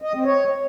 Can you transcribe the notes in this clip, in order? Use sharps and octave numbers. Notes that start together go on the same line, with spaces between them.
D#5
C4
C#5